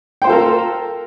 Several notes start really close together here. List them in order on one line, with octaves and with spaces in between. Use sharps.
G5 C5 F4 A4 A#4